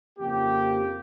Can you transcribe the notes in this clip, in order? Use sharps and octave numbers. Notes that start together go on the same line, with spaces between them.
F2 C#3 F3 A#3 G4